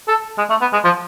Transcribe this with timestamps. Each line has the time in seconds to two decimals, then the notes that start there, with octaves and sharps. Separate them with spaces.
0.08 A4
0.38 G#3
0.50 A3
0.61 B3
0.73 G#3
0.84 F3